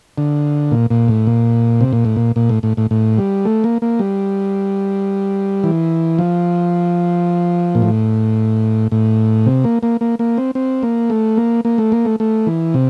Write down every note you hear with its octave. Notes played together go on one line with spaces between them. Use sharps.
D3
A#2
A#2
A2
A#2
C3
A#2
A2
A#2
A#2
A2
A2
A2
A2
G3
A3
A#3
A#3
G3
E3
F3
A#2
A2
A2
C3
A#3
A#3
A#3
A#3
C4
C4
A#3
A3
A#3
A#3
A3
A#3
A3
A3
E3
C3